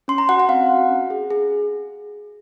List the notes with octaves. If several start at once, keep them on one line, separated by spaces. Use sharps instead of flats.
C#4 C6
A#5
F#4 F#5
F#5
C4 F5
F#4
C#4
G#4
G#4